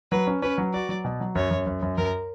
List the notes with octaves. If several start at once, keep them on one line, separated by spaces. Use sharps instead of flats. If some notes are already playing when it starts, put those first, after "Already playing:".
F#3 B4
C#4
C#4 B4
F#3
F#4 D5
F#3
B2
F#3
F#2 C#5
F#2
F#2
F#2
F#2 A#4